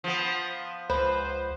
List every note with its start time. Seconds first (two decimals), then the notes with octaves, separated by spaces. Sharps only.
0.04 F3 B3
0.90 C#2 B4 C5